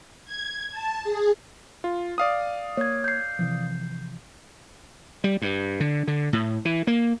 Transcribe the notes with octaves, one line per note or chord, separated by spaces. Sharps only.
G#6
A5
G#4
F4
D5 F5 D#6
A#3 C#5 G#6
G6 C7
C3 E3 F3
G3
G2
D3
D3
A2
E3
A#3